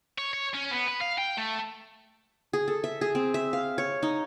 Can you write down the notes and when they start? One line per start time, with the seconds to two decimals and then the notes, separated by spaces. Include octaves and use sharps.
0.18 C#5
0.34 C#5
0.54 C#4
0.71 B3
0.88 B4
1.01 F5
1.18 G5
1.38 A3
2.53 G#4
2.68 A4
2.84 E5
3.01 G#4
3.15 C4
3.34 E5
3.53 F5
3.78 C#5
4.03 D#4